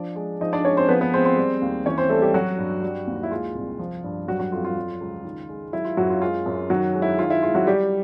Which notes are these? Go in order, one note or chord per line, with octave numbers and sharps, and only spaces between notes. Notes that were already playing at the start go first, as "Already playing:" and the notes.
Already playing: F3 D4 D5
G#3
F3 D#4 D#5
D4 D5
G#3 C#4 C#5
C4 C5
F3 B3 B4
B3 B4
G#3 C4 C5
C4 C5
G3
D#2
E3 C#4 C#5
C4 C5
G3 A3 A4
G3 G4
F#3 F#4
G2
G3
D#2
E4
G#3 F4
C2
F3
G2
F#3 G3 F#4
F#3 F#4
F2 F4
F4
F#3
C#2
D#3
G#3
F#3 E4
F4
F#2 F#3 F#4
F4
G#3 F4
F#2
D#3 F#3 F#4
G#3
E4
D#3 F4
E4
G#3 F4
F#3 F#4
G3 G4